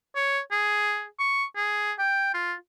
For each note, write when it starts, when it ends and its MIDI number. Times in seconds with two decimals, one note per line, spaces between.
0.16 0.39 73
0.52 1.05 68
1.19 1.45 85
1.56 1.92 68
1.99 2.32 79
2.34 2.54 65